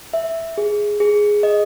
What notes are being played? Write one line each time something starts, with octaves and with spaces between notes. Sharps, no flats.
E5
G#4
G#4
D#5